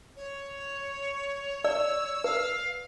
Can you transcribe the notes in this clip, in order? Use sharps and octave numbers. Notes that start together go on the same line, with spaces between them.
C#5
D5 E6
B4 F5